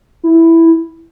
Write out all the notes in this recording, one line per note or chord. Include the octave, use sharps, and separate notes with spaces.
E4